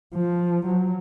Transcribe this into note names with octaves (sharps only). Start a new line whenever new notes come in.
F3
F#3